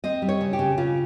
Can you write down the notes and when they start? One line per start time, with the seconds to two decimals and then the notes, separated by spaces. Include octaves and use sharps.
0.04 C4 D#5
0.22 G3
0.29 C#5
0.41 C#3
0.53 G4
0.59 C#3
0.78 C#3 F4